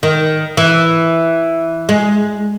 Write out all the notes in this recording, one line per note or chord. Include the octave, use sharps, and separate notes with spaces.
D#3
E3
G#3